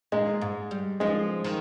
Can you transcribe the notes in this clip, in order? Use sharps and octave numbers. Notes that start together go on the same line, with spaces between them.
A#2 G#3
G#2
G3
F3 G#3
D#3